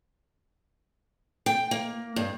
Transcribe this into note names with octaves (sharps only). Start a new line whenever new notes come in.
G5
A#3
G2